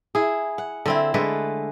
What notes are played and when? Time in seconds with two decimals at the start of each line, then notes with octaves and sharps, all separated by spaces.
0.15 E4 G#4
0.58 F#5
0.86 D3 C4 E4
1.14 D3 G#3 A3 B4